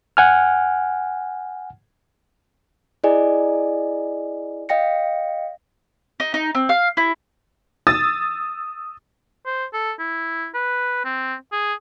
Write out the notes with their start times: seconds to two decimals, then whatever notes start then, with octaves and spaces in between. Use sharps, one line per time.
0.17 F#5 G#5 F6
3.04 E4 G#4 D5 D#5 G#5
4.69 D#5 F5 G5 A#6 C#7
6.20 D#4
6.34 D#4
6.55 C4
6.69 F5
6.97 E4
7.87 D#6 E6 A6
9.46 C5
9.73 A4
9.99 E4
10.54 B4
11.05 C4
11.52 G#4